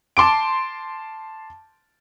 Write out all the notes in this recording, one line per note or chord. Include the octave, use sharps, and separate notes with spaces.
A5 C6 D6 D7